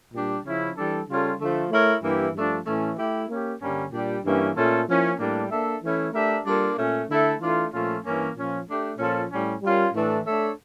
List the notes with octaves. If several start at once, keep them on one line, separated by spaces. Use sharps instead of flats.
A#2 G3 D4 G4
C#3 F3 C#4 E4
E3 G3 D4 A4
C#3 G3 C#4 F4 A4
D3 F3 A3
A3 E4 A#4 C#5
G2 E3 A#3 E4 G4
G2 F3 A3 D4
A2 E3 A3 C#4
A3 E4 G4
A#3 C#4 G4
G2 D3 G3 A#3 C#4
A#2 G3 D4 G4
G2 E3 A#3 C#4
A#2 A3 C#4 F4 A4
F3 A#3 C#4 E4
A2 G3 A#3 D4
A#3 D4 A4 E5
E3 A3 C#4 E4
A3 D4 G4 A#4 E5
G3 A#3 D4 F4 A4
A#2 A3 C#4
D3 A3 E4 A4 E5
E3 A3 D4 F4
A#2 F3 A3 C#4 F4
G2 E3 A#3 C#4
A#2 F3 C#4
A3 D4 G4
A#2 F3 C#4 F4 A4
A2 G3 C#4
G3 C#4 F4 A#4
A2 E3 A3 D4 A4
A3 D4 A4 C#5 E5